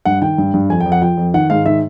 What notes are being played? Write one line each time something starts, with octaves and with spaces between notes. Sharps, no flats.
G2 F#5
D#3 G5
G2
G2
F2 G#5
G5
F2
F#5
F3 G5
F2
D#3 F#5
G#2 F5
D#3 E5